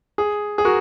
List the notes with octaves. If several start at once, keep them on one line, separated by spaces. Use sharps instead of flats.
G#4
G#4
F#4 A#4